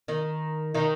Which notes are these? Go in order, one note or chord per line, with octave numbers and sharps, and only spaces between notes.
D#3 D#4
D#3 D#4